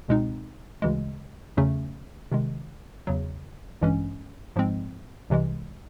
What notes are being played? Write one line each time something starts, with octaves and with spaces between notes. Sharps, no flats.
C#2 B2 G#3 C4 D#4
D2 C#3 E3 G#3
E2 C#3 F#3 A3 C#4
C3 D#3 G#3
E2 C#3 F#3
A1 G2 E3 G#3 C#4
G#2 F3 G#3 C4
C2 C3 E3 G#3